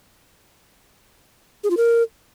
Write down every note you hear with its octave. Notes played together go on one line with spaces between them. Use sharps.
G#4
F4
A#4